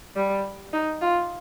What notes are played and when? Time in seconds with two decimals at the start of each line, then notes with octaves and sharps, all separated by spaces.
0.16 G3
0.73 D#4
1.01 F4